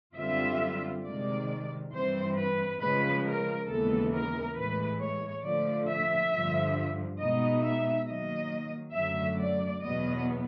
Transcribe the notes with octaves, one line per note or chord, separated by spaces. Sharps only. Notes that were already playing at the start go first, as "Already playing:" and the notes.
F#2 D3 G3 C4 F4 E5
C3 D#3 G#3 D5
G2 E3 G3 C4 C5
B4
C#3 F3 G#3 B4
A#4
D#2 C#3 E3 G#3 B3 A4
A#4
A2 E3 G#3 B4
C#5
D3 F3 A3 D5
E5
G2 D3 F3
B2 G#3 B3 D#4 D#5
E5
D#3 F#3 A#3 D#5
F#2 D3 F#3 A3 E5
D5
E2 B2 F#3 B3 D#5